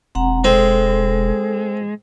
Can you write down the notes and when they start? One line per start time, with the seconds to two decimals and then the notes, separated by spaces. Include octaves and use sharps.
0.15 E1 C4 F#5 A#5
0.44 G#3 C4 A4